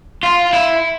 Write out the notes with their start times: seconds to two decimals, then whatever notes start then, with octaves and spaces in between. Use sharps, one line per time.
0.23 F4
0.53 E4